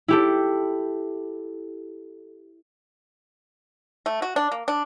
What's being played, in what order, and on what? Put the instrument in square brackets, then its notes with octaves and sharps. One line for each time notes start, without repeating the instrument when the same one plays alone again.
[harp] E4 G4 A4
[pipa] A3
F#4
D4
A#3
D4